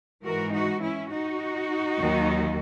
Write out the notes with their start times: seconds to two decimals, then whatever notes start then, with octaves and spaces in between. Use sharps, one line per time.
0.24 G#2 E3 G#3 F#4 A#4
0.53 D#4 F#4
0.82 C#4 E4
1.11 D#4 F#4
1.98 D#2 D#3 F#3